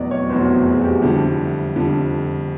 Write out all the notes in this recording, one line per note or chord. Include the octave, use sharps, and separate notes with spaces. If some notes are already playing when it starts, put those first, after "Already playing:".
Already playing: F1 E2 B2 F#3 B3 D5 D#5
C#5
F1 E2 B2 F#3 B3 C5
G#4
F#4
G4
F2 D3 G3 E4
F2 D3 G3